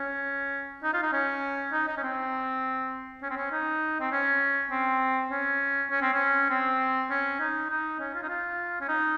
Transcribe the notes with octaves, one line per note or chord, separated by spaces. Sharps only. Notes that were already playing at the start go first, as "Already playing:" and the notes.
Already playing: C#4
D#4
F4
D#4
C#4
D#4
D#4
C#4
C4
C#4
C4
C#4
D#4
C4
C#4
C4
C#4
C#4
C4
C#4
C4
C#4
D#4
D#4
C#4
F4
D#4
F4
C#4
D#4